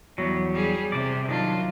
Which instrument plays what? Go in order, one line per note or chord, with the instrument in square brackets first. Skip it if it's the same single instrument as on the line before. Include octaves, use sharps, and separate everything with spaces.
[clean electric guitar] E2 F#3 [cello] G3
[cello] G3 G#4
[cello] C3 [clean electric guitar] D5
[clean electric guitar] D#3 D4 [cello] F#3 F4